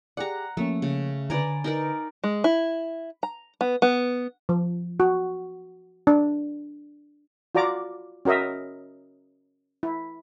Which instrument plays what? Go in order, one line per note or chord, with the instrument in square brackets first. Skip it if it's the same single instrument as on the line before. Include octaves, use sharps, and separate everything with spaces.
[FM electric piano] G4 G#4 D5 [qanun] F#5 A#5
[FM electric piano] F3 A#3 C#4 [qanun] A3
[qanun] C#3
[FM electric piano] D3 B4 [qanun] D5 G#5 A#5
[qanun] D#4 A#4 D5
[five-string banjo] G#3
E4
A#5
B3
B3
[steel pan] F3
F#4
D4
F4 F#4 D5 A#5 D6
C#4 F#4 A#4 D#5 E5
E4